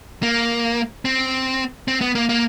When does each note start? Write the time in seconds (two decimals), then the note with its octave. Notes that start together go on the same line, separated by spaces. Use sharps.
0.23 A#3
1.05 C4
1.88 C4
2.01 B3
2.15 A#3
2.29 A#3